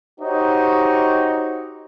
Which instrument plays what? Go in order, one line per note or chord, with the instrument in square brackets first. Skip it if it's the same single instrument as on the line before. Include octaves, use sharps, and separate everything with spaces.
[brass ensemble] D#4 F#4 G4 C5 C#5 D#5